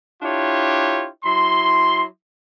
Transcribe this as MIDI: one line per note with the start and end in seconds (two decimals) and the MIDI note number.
0.23 1.08 62
0.23 1.08 64
0.23 1.08 65
0.23 1.08 67
0.23 1.08 73
1.24 2.03 54
1.24 2.03 64
1.24 2.03 84